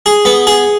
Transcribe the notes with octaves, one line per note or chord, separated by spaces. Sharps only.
G#4
B3
G#4